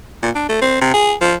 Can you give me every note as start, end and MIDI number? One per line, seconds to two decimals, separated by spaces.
0.22 0.30 46
0.35 0.49 62
0.49 0.59 57
0.61 0.76 60
0.81 0.90 48
0.94 1.14 68
1.21 1.35 53